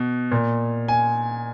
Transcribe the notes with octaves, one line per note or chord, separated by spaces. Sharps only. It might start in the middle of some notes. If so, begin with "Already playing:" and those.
Already playing: B2
A#2
G#5